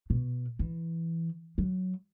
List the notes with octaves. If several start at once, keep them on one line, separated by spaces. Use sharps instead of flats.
B2
E3
F#3